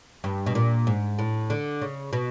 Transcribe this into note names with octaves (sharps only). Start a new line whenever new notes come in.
G2
B2
A#2
G#2
A2
D3
C#3
B2